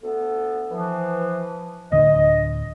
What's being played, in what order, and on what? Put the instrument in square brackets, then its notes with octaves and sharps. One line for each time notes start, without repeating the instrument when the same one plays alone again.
[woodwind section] D2 B3 A4
E3 F3
[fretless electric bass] D1 D2 D3 [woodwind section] D#5